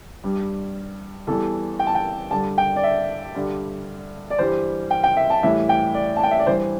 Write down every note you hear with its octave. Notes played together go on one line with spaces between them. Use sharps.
G2 G3
E2 E3 G3 A4
G5
A5
G5
G2 D3 G3 A5
G5
D5
E5
G2 D3 G3
D5
G2 E3 G3 C5
G5
G5
E5
A5
A2 E3 G3 E5
G5
D5
A5
G5
E5
D5
G2 E3 G3 C5